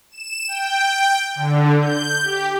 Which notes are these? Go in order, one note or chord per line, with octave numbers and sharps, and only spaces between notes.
E7
G5
D3
G6
G4